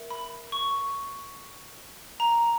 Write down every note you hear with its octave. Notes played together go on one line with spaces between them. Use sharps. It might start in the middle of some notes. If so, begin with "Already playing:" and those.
Already playing: A#4 E5
B5
C#6
A#5